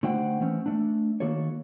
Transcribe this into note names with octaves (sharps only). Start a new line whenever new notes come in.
D3 A3 F#4 C5 F#5 G5
E3 A3 C4 C#4
A3 D4
D#3 A#3 F#4 A4 C#5